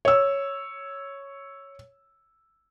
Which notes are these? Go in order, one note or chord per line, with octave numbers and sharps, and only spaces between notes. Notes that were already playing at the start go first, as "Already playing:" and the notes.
C#5 E6